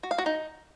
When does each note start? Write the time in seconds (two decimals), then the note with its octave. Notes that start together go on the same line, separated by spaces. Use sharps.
0.03 F#4
0.11 F5
0.18 F#4
0.26 D#4